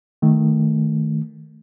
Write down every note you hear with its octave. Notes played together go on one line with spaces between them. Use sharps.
D#3 A3